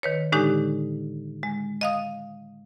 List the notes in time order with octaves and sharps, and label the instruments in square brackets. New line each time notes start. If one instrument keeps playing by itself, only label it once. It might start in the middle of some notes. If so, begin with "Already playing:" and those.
[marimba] D#3 B4 C#5
A2 D3 G#3 D4 D#4 G4
G#3
D#5 F5 D#6